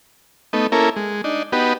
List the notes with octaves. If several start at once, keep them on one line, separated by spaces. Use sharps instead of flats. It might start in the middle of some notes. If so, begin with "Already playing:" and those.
A3 B3 D#4
A#3 C#4 E4 A4 A#4
G#3
D4 D#4
B3 D#4 F#4 G4 B4